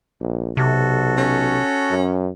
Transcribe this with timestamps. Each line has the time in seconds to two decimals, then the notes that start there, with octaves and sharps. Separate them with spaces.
0.21 A#1
0.57 B1 C3 F#4 A4
1.17 C#4
1.91 F#2